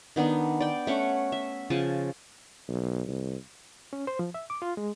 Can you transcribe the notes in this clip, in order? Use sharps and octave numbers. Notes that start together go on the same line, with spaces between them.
D#3 B3 D4 D#4
D5 G5
A3 C#4 F#5
E5
C#3 F3 G#5 A5
B1
C2
C#4
C5
F3
E5
D6
F4
G#3